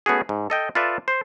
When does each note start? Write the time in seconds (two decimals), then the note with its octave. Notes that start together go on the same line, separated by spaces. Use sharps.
0.06 A3 B3 C#4 F#4 G#4
0.29 G#2
0.50 A4 D#5 G5
0.75 F4 A4 B4 D5 E5
1.08 C5